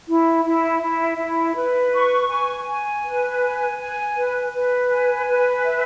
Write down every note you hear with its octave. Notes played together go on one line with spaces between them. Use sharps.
E4
E4
E4
E4
B4
C#6
G#5
G#5
B4
G#5
G#5
B4
B4
G#5
B4
E5